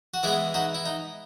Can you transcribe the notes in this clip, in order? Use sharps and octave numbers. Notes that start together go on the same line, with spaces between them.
F#4
E3 G#3 B3 E4 G#4
D#4 F#4
E4
D#4